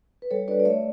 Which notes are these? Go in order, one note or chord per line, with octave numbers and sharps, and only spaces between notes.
B4
G3 A4 C#5
D4 F#4 B4 D5
D5
A3 C#5 E5